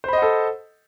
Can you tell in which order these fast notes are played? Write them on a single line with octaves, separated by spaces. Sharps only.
C5 B5 D#5 F#5 A4